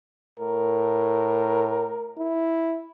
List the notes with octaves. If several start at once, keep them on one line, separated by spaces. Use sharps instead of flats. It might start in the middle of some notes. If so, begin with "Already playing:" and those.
A2 A#4
E4